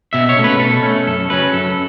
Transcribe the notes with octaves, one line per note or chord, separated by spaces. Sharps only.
B2 E5
C#5
A3 C#4
B4
B2 A4
A3 C#4
F#2 A4
C#3 F#3 C#4 B4
F#2 A4